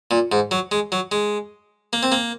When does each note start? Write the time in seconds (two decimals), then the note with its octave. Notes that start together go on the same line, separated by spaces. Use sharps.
0.11 A#2
0.32 G#2
0.51 F#3
0.72 G#3
0.92 F#3
1.12 G#3
1.93 A#3
2.03 C4
2.12 A#3